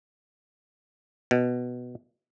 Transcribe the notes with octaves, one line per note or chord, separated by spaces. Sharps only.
B2